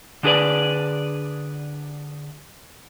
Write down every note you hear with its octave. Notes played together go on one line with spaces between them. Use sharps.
D3 D4 G#4 B4 D5